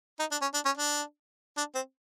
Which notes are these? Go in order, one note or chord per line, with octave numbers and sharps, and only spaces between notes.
D#4
D4
C#4
D4
C#4
D4
D4
C4